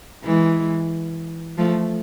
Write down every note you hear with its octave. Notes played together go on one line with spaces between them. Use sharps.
E3 G#3
F3 A3